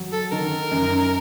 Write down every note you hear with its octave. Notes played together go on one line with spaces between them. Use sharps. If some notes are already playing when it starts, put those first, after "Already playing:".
Already playing: F#3
A4
D#3 A#4
F#2